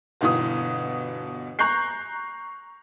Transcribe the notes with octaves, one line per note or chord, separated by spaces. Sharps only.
G1 B2 E3 B3 D#6
A#5 C#6 F#6 G6 C7